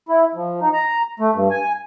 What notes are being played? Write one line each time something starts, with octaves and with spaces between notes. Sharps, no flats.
E4
F3
D#4
A#5
A3
G2
G#5